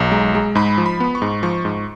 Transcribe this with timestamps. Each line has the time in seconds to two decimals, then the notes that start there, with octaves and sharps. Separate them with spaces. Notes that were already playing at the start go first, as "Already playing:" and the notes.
Already playing: B1 A#5
0.12 G#3
0.35 G#3
0.55 G#2 B5
0.78 F3
0.86 B5
1.00 B3
1.15 C#6
1.22 G#2
1.43 F3 C#6
1.65 G#2